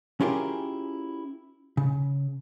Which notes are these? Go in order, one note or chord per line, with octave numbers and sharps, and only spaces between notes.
C#4 E4 F4 G4 G#4 A#4
C#3